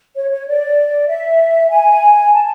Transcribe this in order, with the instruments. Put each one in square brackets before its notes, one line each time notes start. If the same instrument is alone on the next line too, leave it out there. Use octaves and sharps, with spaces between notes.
[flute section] C#5
C#5
D5
E5
G#5
A5